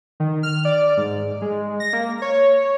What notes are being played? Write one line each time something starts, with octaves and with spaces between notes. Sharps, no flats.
D#3
F6
D5
G#2
G#3
A#6
A#3
C#5